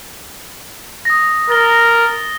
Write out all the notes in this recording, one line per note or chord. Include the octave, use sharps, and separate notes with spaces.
D#6 A#6
A#4 A6 G7